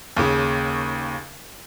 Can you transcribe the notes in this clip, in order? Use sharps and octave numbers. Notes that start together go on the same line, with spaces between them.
D#2 C#3